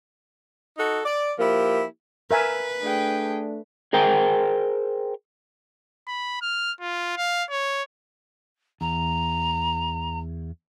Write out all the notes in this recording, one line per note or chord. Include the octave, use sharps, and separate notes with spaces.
D#4 F#4 A4
D5
F3 A#3 E4 G4
A#4 B4 E5 G#5
A3 D4 G#4 G5
G#4 A#4 C5 G5 A#5
B5
F6
F4
F5
C#5
E2 A#5